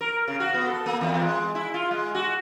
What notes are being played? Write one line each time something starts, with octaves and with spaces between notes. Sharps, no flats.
A#4
C#3
F#4
B3
A4
A#3
E2
G#3
E4
F4
G#3
F#4